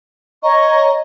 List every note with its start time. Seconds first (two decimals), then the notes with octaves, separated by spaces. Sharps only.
0.43 C#5 D#5 A#5 C#6